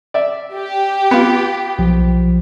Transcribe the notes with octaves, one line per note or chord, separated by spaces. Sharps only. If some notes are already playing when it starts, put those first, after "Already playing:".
D5 E5
G4
B3 F4
B1 F3